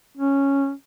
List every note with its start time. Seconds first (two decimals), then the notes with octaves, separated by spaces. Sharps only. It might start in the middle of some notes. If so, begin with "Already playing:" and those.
0.17 C#4